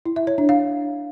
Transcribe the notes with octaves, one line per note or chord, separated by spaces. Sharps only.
E4
E5
C#5
D4
F5